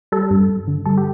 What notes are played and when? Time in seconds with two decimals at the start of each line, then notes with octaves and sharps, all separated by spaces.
0.12 G3 A4
0.31 G2
0.49 G2
0.68 D3
0.86 G3 A4
0.98 G4